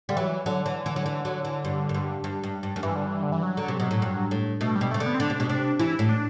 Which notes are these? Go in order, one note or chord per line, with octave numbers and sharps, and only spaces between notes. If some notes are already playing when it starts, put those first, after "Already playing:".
D3 G3
E3 F#3
D3 F#3
E3
E3
F#3
E3
F#3
E3
G2
F#2
G2
G2
G2
G2
F#2
G2 E3
D3
E3
D3
E3
F#3
D3
C3
B2
A2
G2
A2
B2 A3
G3
B2
C3 A3
D3
B3
C4
D3 D4
C3
B2
C3 D4
E3 E4
A2
D4